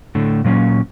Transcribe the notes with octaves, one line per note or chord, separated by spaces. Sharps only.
A2 D3 A3
A#2 F#3 A#3 C#4